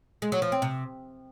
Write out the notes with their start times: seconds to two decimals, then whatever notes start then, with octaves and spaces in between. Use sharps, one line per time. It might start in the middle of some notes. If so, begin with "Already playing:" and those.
0.22 G#3
0.32 F#3
0.42 F3
0.52 C4
0.62 C3